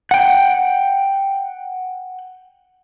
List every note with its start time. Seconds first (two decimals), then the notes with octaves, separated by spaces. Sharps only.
0.11 F#5 G5